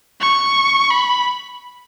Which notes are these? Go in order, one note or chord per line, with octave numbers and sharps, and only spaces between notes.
C#6
B5